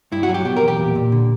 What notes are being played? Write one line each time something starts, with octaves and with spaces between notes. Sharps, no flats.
G2 E4
F#4
F#3
G4
B2 G4
A#4
E2
G4
A#2
A#2
D3